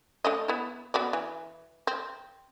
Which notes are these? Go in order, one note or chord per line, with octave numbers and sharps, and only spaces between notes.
A3 D4 D#5
B3 E4
B3 F#4 D5
E3
C4